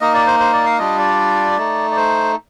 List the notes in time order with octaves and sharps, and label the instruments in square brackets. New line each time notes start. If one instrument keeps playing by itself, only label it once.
[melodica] A#3 D#4 D#5
D5
C5
C5
D5
F5
G3 D4 F4 D#5
D5
A3 D#4
D5
C5